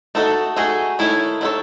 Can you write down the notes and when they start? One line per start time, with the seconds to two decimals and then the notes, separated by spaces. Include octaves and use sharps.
0.15 A3 D#4 F#4 A4
0.56 A3 D#4 F#4 G#4
0.99 D#3 A3 D#4 E4 A4 C#5
1.41 D#3 A3 D#4 A4 C#5